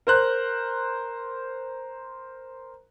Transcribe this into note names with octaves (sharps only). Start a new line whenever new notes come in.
A#4 C5 F#6